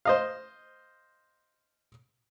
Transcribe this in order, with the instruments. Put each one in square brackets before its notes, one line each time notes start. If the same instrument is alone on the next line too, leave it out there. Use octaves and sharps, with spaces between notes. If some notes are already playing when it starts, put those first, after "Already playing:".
[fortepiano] C5 D#5 F5